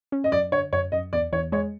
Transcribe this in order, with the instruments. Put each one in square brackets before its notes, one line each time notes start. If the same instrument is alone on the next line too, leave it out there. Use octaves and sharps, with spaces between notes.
[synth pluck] C#4
[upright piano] D#5
[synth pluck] F#2 [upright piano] D5
[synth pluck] D3 [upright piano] C#5
[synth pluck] F#2 [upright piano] C#5
[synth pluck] F#2 [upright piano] D#5
[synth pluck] E2 [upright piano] D5
[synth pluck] E2 [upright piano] C#5
[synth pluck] G#3 [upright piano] C#5